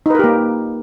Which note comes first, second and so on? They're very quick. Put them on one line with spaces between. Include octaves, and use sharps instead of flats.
D#4 B4 A#4 G4 A#3